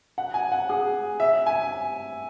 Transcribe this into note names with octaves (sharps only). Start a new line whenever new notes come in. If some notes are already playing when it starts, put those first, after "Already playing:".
F#5
G#5
F#5
G#4
E5
G#5